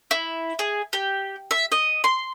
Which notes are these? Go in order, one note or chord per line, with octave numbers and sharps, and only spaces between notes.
E4
G#4
G4
E5
D#5
C6